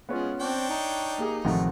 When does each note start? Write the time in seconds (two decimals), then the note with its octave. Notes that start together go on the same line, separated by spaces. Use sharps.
0.09 G#3 B3 C#4 F4
0.40 C4 D4 C#5 G5
0.69 D#4 A5
1.18 A#3 G4 G#4
1.45 A1 F2 C3 D#3 G#3 A3 F#4